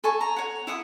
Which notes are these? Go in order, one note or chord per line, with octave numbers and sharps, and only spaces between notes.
A4 G#5 A5 C#6
A#5
C#5 F#5
E4 F#5 D#6